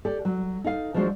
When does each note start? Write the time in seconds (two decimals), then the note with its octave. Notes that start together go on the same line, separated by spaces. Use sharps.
0.05 G4 A4 D5
0.25 F#3
0.64 D#4 A4 F5
0.94 F3 F#3 G#3 D4 F#4 C5